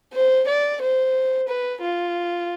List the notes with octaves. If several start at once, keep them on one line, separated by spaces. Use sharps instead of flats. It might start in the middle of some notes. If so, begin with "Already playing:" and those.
C5
D5
C5
B4
F4